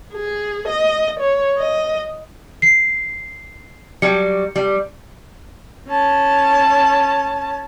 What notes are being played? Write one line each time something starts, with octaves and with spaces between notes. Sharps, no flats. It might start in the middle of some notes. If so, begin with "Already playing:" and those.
G#4
D#5
C#5
D#5
C7
F#3 G3 C#7
G3
C#4 A5